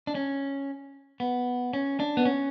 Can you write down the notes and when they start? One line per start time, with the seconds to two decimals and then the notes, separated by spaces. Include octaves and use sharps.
0.07 D4
0.15 C#4
1.20 B3
1.73 C#4
2.00 D4
2.17 B3
2.25 C#4